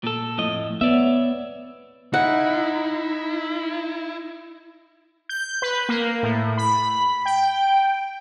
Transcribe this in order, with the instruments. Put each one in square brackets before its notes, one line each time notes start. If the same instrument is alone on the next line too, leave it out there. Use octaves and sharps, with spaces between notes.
[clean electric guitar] A#2 A4
F2 A2 D#5
[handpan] B3 [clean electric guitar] C#5 D5 E5
[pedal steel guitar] D#4 [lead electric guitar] E4 [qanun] F#5
[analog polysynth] G6
B4
A#3
A2
B5
G5